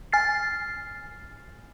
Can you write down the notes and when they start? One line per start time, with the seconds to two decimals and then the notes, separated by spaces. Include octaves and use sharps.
0.12 G#5 F6 A6 C7